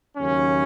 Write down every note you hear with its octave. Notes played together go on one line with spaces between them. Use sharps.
D#2 C#3 F#3 C#4